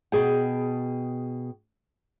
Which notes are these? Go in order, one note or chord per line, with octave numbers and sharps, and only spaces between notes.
B2 G#4 G5